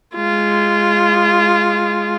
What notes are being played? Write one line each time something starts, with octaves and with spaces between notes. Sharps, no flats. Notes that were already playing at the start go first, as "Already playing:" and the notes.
G#3 F4